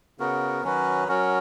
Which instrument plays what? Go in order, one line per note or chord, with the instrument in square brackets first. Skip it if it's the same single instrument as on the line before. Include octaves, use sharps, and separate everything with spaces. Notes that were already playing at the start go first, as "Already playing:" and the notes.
[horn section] C#3 [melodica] B3 F#4 A#4
[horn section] D#3 [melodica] F#3 C#4 F#4 B4
[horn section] F#3 [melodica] C#4 F#4 A#4